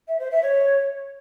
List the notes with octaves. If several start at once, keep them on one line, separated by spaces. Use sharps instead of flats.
E5
C5
E5
C#5